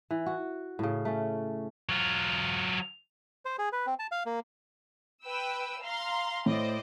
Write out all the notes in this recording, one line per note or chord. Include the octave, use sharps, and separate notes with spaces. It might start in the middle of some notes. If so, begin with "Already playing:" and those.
E3
F#4
A2 C#3
A3 C#4
F#3 F4
C5
G#4
B4
C4
A5
F5
A#3
B4 G5 E6
F5 A#5 C6
A2 C5 D5 D#5